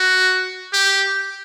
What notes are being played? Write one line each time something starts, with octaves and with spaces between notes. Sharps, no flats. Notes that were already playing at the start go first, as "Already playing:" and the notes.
Already playing: F#4
G4